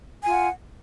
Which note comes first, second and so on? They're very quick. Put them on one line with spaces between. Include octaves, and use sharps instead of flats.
G#5 F4 F#5